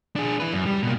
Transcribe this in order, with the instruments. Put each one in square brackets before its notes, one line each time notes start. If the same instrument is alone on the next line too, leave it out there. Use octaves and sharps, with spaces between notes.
[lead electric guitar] D4 G#4
E4 B4
F#2
G3
B2 A#3